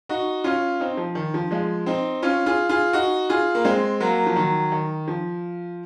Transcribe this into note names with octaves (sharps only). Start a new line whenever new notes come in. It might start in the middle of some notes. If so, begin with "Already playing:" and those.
D#4 F#4
C#4 F4
C4 D#4
F3
D#3
F3
F3 G#3
C4 D#4
C#4 F4
F4 G#4
F4 G#4
D#4 F#4
F4 G#4
A#3
G#3 C4
F#3 A#3
F3
D#3 F#3
D#3
F3